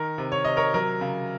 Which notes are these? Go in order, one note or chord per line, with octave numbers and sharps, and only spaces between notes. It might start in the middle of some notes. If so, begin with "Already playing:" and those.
Already playing: D#3 A#4
C3
C#5
C3 D#5
A#4 C#5
F#3 A#4
C#3